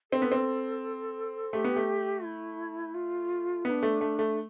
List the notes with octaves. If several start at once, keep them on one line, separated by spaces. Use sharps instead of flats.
C4 A4
B3
C4
A3 G4
B3
A3
E4
F4
B3 E4
D4
A3
A3
A3